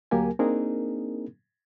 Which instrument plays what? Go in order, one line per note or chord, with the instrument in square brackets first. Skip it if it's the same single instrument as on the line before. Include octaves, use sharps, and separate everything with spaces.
[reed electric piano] D2 F#3 A#3 G4 A#4 G#5
A#3 C4 D4 D#4 G#4 A#4